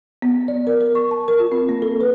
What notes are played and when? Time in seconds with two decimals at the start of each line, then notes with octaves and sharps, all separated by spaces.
0.22 B3
0.48 D5
0.67 A#4
0.81 A#4
0.95 C#6
1.11 A5
1.28 A#4
1.40 F4
1.52 C4
1.69 A#3
1.82 A4
2.01 B4